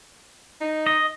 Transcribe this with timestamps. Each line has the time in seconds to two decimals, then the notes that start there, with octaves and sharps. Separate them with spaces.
0.61 D#4
0.87 D#5